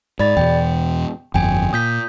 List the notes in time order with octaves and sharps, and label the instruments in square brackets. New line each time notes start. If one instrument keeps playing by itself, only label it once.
[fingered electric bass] G#2 [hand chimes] D5 B5 A6
[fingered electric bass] E2 B2 [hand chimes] G5
[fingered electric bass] G1 F2 [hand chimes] G5 G#5
[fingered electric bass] A#2 [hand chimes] D#6 G6 B6